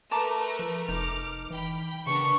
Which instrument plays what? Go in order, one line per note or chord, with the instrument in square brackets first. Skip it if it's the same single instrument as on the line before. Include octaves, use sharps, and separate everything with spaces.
[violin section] A3 A#4 B4 [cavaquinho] A5 A#5 D6
[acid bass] F3
[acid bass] F1 [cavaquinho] D#4 [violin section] D6 F6
[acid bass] E3 [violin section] G5 B5
[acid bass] C#3 [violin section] B3 D4 A#4 [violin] C#6